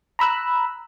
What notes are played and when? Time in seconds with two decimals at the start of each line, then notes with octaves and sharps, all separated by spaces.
0.19 A#5 B5 E6 F#6